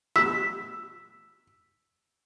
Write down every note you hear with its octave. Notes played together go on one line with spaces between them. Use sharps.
E6 B6